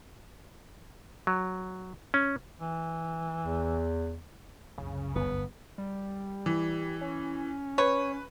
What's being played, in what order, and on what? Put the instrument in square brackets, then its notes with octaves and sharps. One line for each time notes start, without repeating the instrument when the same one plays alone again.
[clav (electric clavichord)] F#3
C#4
[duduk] E3
[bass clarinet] E2
[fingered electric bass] D1 C2 F#2 [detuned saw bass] C#3
[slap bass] G1 [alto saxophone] B3
[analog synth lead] G3
[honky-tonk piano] E3
[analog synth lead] C#4
[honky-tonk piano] B4 [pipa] C#5